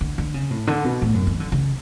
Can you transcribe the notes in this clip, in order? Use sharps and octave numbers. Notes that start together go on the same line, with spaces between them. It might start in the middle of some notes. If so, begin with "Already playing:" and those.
D3
D3
C#3
A2
D3
B2
A2
F#2
E3
D3
C#3